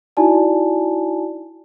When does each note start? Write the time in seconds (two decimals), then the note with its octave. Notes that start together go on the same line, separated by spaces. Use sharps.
0.17 D#4 E4 F#4 D5 G#5 A5